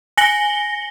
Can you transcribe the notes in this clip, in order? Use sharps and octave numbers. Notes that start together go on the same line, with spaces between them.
G#5 A#6 C#7 F#7 G7